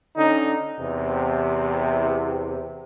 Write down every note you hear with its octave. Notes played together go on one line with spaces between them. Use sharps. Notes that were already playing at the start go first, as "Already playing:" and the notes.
D3 C#4 D#4
E2 C3